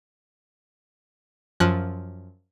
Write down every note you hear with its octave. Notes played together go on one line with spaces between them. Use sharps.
F#2 F3 F#6